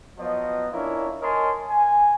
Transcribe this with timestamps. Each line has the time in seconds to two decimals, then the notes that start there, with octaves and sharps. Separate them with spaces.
0.18 F3 F#3 B3 D#5
0.71 C#4 D4 E4 F4 A#4 C#5
1.22 A#4 C#5 D#5 G#5 A5 C6
1.68 G#5